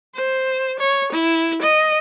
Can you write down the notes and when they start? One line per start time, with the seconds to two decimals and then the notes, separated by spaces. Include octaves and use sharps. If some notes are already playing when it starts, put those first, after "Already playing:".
0.15 C5
0.79 C#5
1.12 E4
1.61 D#5